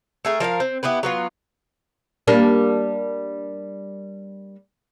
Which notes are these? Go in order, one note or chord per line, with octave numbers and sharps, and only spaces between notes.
A3 G#4 A#4
F3 A#4 D#5 F5
C4
B3 E4 G4 B4
F#3 B3 F4
G3 A#3 D4